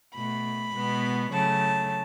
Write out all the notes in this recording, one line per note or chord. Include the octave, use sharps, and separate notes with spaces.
B2 A3 B5
B2 G#3 B3
C#3 F#3 A3 A5